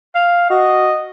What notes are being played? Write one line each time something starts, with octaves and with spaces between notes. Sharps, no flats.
F5
F#4 D#5